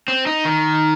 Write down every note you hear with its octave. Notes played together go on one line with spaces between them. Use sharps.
C4
D#4
D#3